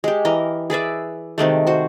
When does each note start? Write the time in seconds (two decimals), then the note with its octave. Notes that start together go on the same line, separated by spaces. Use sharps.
0.04 G#3 G4
0.25 E3 A#4 D#5
0.70 G#4 B4 D5 E5
1.38 C3 D#3 G#3 A3
1.67 F#4 C5